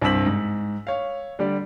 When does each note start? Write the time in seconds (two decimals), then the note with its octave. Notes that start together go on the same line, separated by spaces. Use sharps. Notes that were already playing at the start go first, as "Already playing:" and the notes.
0.02 C2 G2 C4 E6 B6 F#7
0.26 G#2
0.87 C#5 F5
1.39 D3 G3 G4 D5